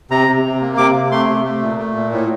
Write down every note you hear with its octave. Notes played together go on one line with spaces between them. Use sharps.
C3 A#5
C3
C3
A#3
C3 D6
C3
A3 C6
C3
A3
A#2
A3
A#2
A2